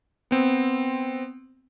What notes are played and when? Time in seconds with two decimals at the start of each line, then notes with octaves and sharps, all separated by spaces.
0.31 B3 C4